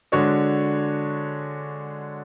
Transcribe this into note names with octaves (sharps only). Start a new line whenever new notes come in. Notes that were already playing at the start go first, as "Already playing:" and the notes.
D3 G#3 D4 F#4 C#5